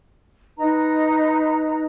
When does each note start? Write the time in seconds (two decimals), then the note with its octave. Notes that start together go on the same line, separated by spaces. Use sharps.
0.57 D#4 B4 A#5